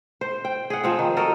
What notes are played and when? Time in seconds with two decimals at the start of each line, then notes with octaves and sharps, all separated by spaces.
0.21 C5
0.45 G5
0.70 G#4 F#5
0.84 F3 C4 F#5
0.99 D#3
1.16 F#4 A4 A#4 D#5